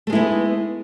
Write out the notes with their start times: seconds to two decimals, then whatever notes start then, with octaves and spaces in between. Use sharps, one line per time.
0.07 A3
0.10 G#3
0.12 E4
0.15 B3